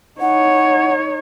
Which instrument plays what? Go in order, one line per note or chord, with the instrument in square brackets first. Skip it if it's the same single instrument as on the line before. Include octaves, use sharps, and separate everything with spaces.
[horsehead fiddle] D#4 C#5 [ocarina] F#5